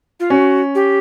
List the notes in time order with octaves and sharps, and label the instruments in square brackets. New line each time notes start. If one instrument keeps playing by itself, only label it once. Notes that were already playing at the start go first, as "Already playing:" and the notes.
[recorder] F4
[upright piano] C#4 [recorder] F#4
[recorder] G4